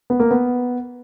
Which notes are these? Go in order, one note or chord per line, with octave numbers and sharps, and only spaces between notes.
B3
A#3
B3